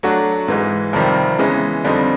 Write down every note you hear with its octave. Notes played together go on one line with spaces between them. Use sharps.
F#3 A3 D4 F#4
G#2 E3 G#3
F2 C3 D#3 G3 C4
C#3 E3 G#3 B3
F2 D3 G3 C4 D#4